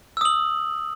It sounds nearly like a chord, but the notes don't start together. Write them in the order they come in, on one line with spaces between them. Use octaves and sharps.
E6 D#6 F#7